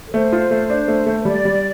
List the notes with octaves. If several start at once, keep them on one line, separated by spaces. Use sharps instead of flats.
A4
A3 C5
F4
A3
D4
A3
A3
C5
G3 D5
G3